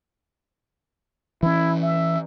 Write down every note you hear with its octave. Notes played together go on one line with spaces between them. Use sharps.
E3 C#4 E4
E5